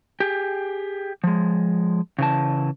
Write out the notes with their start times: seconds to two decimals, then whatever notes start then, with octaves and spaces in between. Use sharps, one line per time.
0.20 G4 G#4
1.24 F3 G#3
2.19 C#3 E3 A5